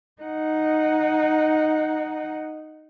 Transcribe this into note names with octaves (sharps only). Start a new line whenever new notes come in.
D#4 F#5